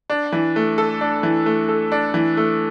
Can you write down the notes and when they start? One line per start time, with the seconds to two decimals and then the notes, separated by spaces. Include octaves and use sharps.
0.10 D4
0.32 E3
0.56 A3
0.78 A4
1.01 D4
1.23 E3
1.46 A3
1.69 A4
1.92 D4
2.14 E3
2.37 A3